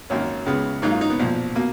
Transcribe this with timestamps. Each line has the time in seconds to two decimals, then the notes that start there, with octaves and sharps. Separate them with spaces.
0.10 G#1 F#2 D#3 A#3 C#4
0.46 C#2 C#3 G#3 B3
0.82 G#2 F#3 A#3 D#4
0.92 F4
1.01 D#4
1.10 B3
1.19 B1 A#2 F3
1.55 B2 A#3